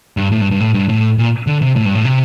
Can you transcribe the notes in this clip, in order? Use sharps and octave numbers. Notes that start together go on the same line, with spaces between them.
G2
A2
G2
G2
A2
G2
A2
A#2
D3
C3
A2
G2
A2
C3